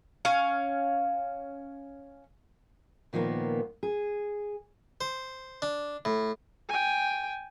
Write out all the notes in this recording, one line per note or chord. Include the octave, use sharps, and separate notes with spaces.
C#4 F5
A#2 D#3 F3 A#3 B3
G#4
C5
D4
A2
G5 G#5